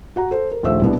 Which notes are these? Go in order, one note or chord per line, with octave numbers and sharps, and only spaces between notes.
F#4 F#5 A#5
A4 C5
A#4
A#1 D#2 A3 C5 E5 E6
C2 B2 B3 D4 E4